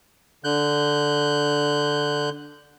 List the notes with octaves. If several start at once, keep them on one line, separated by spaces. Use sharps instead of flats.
D3 F#6 G6